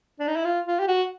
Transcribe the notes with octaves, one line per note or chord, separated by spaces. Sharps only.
D4
D#4
E4
F4
F4
G4
F#4